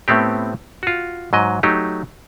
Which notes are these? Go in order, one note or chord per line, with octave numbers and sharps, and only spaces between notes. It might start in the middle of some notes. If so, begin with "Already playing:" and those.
A2 A3 B3 C4 G4
F4 F#4
G#2 F#3 D#5
F#3 A3 D#4 G4